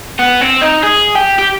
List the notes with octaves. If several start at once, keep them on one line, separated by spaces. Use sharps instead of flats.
B3
C4
D#4
G#4
G4
G4